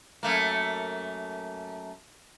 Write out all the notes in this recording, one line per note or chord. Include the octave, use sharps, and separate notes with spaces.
F#2 A3 A#3